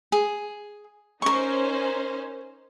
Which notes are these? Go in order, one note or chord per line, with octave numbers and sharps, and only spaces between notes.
G#4
C#4 D#4 A#4 C5 C#6